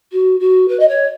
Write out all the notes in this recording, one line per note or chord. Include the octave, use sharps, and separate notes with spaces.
F#4
F#4
B4
D#5
C#5